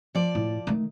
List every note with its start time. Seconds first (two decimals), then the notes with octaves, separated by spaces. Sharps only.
0.15 F3 D5
0.35 A2
0.67 D#3 A3